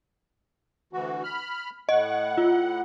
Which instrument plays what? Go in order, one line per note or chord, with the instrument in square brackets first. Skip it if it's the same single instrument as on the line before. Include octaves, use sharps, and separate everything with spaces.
[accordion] D2 E3 F#4
B5 F6
[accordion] A2 F#5 [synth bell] D#5
[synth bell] F4